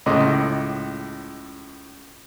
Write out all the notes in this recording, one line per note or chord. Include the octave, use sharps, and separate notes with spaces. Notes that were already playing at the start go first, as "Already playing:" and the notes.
C#2 A2 C#3 D#5 C6 D6